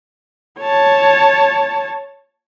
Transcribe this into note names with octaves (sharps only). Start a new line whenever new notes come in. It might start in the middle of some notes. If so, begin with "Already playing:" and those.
C#5 A5